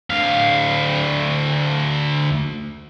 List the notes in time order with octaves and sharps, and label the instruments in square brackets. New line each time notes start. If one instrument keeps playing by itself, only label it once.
[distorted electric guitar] D2 F5